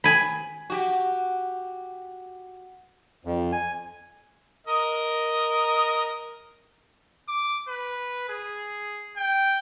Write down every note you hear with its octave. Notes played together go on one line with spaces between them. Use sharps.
G#5 B5
F#4 G4
F2
G#5
A#4 D#5
D6
B4
G#4
G5